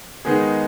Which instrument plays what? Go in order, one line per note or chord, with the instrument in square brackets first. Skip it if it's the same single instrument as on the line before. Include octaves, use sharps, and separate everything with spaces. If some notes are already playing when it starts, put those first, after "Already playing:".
[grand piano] D#3 G#3 B3 D#4 G#4